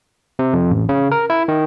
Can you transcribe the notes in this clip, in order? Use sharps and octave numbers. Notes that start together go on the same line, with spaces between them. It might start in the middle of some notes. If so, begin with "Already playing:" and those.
C3
F2
A1
C#3
A#4
E4
D#3